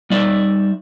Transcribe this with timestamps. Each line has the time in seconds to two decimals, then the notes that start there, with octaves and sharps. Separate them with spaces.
0.10 G3 D#4 D5 E5